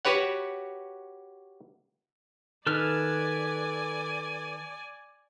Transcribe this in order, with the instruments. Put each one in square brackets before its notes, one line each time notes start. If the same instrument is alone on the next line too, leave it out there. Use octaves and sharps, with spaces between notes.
[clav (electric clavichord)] F#4 G4 B4 C#5 F#5
[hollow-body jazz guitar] D#3 [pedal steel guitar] A4 B4 F6 [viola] D5 G#5